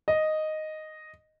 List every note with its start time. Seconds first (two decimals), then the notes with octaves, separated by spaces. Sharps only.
0.08 D#5